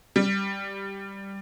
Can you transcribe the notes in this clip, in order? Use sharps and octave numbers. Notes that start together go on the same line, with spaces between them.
G3